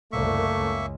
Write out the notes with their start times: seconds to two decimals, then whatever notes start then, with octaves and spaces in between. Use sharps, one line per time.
0.12 F#1 C2 A3 A#3 E5 C#6
0.55 C#2